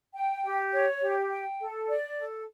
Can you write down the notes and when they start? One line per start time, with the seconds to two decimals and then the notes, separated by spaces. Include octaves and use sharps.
0.15 G5
0.43 G4
0.72 C#5
1.02 G4
1.30 G5
1.59 A4
1.89 D5
2.18 A4